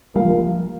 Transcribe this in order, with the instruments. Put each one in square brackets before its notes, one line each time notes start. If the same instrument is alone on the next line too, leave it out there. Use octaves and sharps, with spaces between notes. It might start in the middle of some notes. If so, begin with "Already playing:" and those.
[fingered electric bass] G3 [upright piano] A#3 F4 A#4 F5
[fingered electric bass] F3